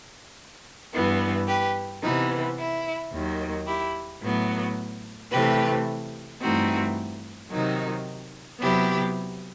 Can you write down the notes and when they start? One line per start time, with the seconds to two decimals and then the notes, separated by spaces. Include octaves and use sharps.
0.92 G2 E3 B3
1.47 G4 B4
2.02 C3 E3 B3 D#4
2.58 E4
3.12 D#2 D#3 F#3
3.66 E4 G4
4.22 A2 F#3 B3
5.32 C3 E3 A3 G4 B4
6.41 G2 E3 A3 C4 D#4 F#4
7.51 C3 D#3 F#3 D#4
8.60 C3 F#3 B3 E4 G4